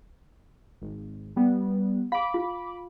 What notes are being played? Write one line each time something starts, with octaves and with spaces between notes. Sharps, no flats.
G#1
G3 B3
F5 B5 D6
F4